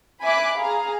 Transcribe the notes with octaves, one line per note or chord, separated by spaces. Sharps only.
E5 G#5 B5 D6 F#6
G#4 F5 A#5